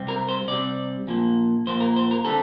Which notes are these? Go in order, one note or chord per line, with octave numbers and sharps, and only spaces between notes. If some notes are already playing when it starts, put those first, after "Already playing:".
Already playing: C3 G3 C4
A#4
C5
C3 G3 C4 D5
A#2 F3 A#3
A#2 F3 A#3 C5
A#4
C5
A#4
D3 G3 C4 A4